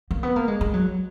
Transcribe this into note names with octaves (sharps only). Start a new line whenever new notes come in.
A#3
B3
A#3
G#3
G#3
F#3